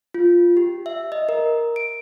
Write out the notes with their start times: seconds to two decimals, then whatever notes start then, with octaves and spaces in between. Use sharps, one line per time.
0.14 F4
0.57 G4
0.86 E5
1.12 D#5
1.29 A#4
1.76 D7